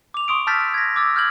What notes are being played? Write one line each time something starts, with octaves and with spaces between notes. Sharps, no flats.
D6 F7
C6 C#6 D#6 D7
A5 E6 F6 G6 A6 B6
G#6 A#6
D6 E6 A6
F6 G6 G#6 F#7